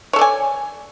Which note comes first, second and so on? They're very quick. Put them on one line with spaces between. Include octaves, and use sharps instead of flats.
C#5 A4 D5 G#5